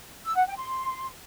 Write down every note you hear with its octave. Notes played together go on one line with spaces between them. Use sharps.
E6
F#5
G5
C6